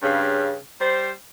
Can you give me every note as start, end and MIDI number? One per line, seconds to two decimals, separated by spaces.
0.03 0.56 43
0.03 0.56 49
0.80 1.11 55
0.80 1.11 72